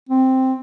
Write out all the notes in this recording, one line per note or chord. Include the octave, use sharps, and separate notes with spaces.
C4